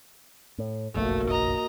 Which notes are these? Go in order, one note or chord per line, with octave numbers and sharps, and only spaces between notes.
A2
F#1 B1 F2 A3 A#3 F#4
D#5 A#5